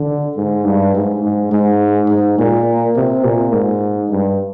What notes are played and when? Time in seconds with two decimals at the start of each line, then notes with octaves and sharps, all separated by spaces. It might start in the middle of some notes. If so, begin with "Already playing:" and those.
Already playing: D3
0.37 G#2
0.65 G2
0.95 G#2
1.24 G#2
1.51 G#2
2.09 G#2
2.39 A#2
2.96 C3
3.24 A#2
3.53 G#2
4.10 G2